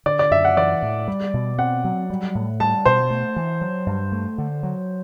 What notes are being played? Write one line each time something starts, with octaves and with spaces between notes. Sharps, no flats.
D3 D5
D5
F#2 E5
F#5
E3 D5
A2
G3
B2
C4 F#5
F#3
G3
A2
G3 A5
B2 C5
A3
E3
F#3
G2
A3
D3
F#3